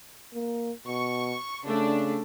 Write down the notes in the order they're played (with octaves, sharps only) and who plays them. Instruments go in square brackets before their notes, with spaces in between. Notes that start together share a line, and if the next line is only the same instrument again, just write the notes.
[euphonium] A#3
[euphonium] B2 [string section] C#6
[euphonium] C#3 [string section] A3 D4